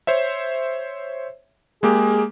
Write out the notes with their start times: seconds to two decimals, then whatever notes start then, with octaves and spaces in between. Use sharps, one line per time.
0.07 C5 C#5 E5
1.83 G#3 A#3 G4 G#4